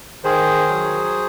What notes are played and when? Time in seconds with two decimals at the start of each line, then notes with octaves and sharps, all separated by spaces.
0.24 D#3 G#4 C5
0.68 F#3